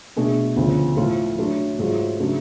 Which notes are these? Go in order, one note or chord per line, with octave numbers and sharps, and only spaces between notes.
B2 A3 D4 G#4
D2 C#3 F3 B3
A2 F3 A3 F4 A4
F#3 A3 D4
G#2 F#3 A3 F4
C#3 F#3 A3 D4